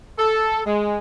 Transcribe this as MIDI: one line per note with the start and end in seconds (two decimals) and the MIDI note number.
0.18 0.61 69
0.65 0.98 56